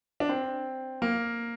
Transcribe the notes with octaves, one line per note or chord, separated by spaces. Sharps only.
D4
C4
A#3